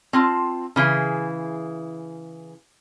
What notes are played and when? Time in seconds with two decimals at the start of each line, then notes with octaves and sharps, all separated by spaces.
0.13 C4 F4 A5
0.76 C#3 E3 E4 G#4